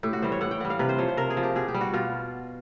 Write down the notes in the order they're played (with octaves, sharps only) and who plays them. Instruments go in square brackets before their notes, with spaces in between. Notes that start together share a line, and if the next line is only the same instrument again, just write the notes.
[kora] A2 G4
F#4
E3 G3 C5
C#5
A2 F#5
G5
E3 G3 F#5
F5
C3 B4
C5
F3 C#5
C5
C3 A#4
G#4
F3
G4
B2 G#4
G4
G3
F#4
B2 F4